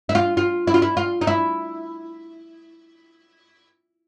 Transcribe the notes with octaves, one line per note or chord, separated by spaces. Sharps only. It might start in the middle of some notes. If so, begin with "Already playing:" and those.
E4
F4
F4
E4
F4
E4
F4
D#4
E4